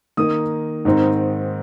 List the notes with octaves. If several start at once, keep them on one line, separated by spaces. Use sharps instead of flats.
D#3 A#3 D#4 D#6
G#2 D#3 C4 D#4